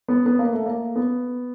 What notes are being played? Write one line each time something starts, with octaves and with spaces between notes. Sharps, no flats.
B3
B3
A#3
A3
A#3
B3